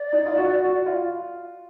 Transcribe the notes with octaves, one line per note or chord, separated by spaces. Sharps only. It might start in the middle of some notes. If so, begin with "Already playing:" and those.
Already playing: D5
D#4
F4
F#4
F#4
F4